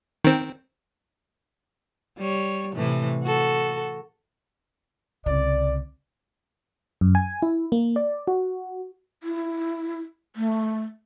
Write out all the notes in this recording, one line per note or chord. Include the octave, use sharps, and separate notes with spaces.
D#3 C4
G3 C#5
A2 C3 E3
F#4 A4
C2 C#3 D5
F#2
G#5
E4
A#3
D5
F#4
E4
A3